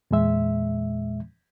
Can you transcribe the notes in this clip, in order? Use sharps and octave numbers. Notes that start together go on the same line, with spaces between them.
E2 A#2 G#3 E5